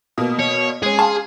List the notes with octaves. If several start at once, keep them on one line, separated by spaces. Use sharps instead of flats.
B2 A#3 D#6
C#5
G#3 C#4 G#4
F5 G#5 A5 C6